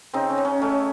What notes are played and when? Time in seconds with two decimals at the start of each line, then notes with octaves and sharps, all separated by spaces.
0.13 C#3 C4 D#4
0.30 C#4
0.38 C#3
0.45 C#4
0.62 A3 C#4